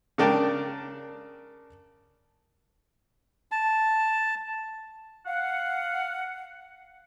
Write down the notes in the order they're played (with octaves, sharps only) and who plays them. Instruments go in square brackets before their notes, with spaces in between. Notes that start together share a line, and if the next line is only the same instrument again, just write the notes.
[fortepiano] C#3 D4 A#4 D5 G5 A5
[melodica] A5
[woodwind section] F5 F#5